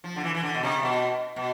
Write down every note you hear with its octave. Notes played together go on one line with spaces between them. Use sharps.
F3
D3
E3
E3
D3
B2
C3
B2
B2